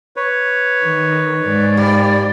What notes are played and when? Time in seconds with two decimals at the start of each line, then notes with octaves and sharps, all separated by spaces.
0.16 B4 C#5
0.82 D#3
1.44 G#2 D5
1.77 G3 A#3